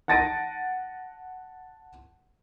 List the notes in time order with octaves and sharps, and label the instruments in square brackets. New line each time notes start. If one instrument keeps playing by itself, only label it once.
[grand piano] F#5 A5 A6 A#6 D7 D#7